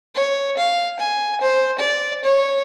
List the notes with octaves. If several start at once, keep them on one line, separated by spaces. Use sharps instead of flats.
C#5
F5
G#5
C5
D5
C#5